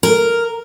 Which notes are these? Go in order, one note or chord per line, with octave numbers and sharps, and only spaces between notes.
A#4